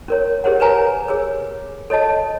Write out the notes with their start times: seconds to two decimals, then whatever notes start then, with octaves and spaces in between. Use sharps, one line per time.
0.08 C#4 A#4 C#5
0.44 G4 G#4 A#4 C5 C#5 F#5
0.60 A#4 B4 C#5 G#5 A#5
1.08 G#4 C#5 E6
1.90 A4 C#5 D#5 A5